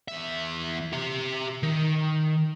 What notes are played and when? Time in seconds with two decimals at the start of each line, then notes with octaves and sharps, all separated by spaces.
0.08 E2 E5
0.92 G4 E5
1.63 D#3